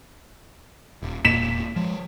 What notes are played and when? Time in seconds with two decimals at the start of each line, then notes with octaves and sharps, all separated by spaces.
1.03 D#1
1.25 E1 A#2 A#3 B6 E7
1.76 F3 G#3